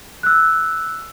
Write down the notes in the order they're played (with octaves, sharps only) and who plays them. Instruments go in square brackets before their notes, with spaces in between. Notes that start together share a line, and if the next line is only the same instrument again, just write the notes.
[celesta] E6 F#6